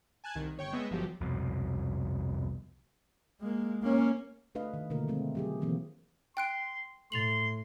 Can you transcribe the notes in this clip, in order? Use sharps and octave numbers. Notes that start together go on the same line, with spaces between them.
G#5 A5 F#6 G#6
C2 D#3
G1 C#5 G5 C#6
G#3 B3 D#5 E5
G1 F3 F#3 G4
C2 F2 B2
G#3 A#3
A#3 C#4
A3 D4 B4 D#5 F5
D#3
B2 D3 A3 A#3 F4 A#4
F3 G#3 A3 C4
F#3 G4 G#4
B2 D#3 E3 F#3 A#3 C4
G5 C6 F#6 D7
A2 C6 A6 F7 F#7